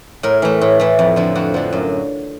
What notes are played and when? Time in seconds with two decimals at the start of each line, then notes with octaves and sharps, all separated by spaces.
0.23 A2 A#4
0.42 E3 A3
0.61 A2
0.80 E3 A3
0.99 F2
1.16 D3 F3
1.35 F2 F#4
1.54 D3 F3
1.73 F#2